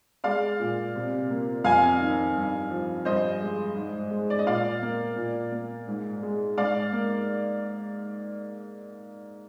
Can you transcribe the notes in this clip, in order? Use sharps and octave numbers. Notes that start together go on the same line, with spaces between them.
G#3 D5 F5
A#2
C3
A#3
F2 F5 G#5
D#3
G2
F3
G2 C5 D#5
G#3
G#2
G#3
D5
D#5
A#2 D5 F5
A#3
A#2
A#3
G#2
G#3
G#2 D5 F5
A#3